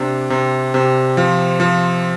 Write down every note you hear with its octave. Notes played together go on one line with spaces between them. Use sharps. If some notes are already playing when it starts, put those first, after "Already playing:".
Already playing: C3 D4
C3
C3
F3
F3